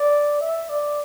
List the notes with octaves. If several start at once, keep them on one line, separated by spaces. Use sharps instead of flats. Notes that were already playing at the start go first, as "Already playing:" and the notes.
Already playing: D5
E5
D5